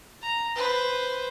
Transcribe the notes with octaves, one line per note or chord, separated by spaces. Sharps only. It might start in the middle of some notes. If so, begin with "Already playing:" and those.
A#5
B4 C5